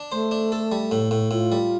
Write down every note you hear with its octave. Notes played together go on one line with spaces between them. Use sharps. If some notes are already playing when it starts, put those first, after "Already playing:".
Already playing: D4
A3 C5
D4
A4
G3
A2
A2
A2 F4
G3